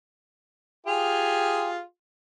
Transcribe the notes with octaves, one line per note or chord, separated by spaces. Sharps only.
F4 G4 G#4